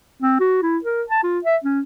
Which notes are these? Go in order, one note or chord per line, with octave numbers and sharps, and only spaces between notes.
C4
F#4
E4
A#4
A5
F4
E5
C#4